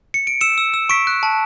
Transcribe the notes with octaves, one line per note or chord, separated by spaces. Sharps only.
C#7
D7
E6 C#7 E7
E6
E6
C#6 B6 D7
F#6
A5